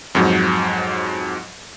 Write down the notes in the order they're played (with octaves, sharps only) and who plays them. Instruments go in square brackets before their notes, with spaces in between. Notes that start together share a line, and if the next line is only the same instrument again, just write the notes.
[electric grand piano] F2 G#2 F#3